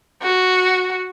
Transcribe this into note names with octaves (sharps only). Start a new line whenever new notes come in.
F#4